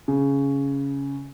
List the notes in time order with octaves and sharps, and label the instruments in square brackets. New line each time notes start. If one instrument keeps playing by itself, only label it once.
[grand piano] C#3